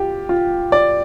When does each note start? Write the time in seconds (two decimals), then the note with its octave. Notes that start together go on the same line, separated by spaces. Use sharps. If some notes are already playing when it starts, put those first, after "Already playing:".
Already playing: F4 G4
0.29 F4
0.72 D5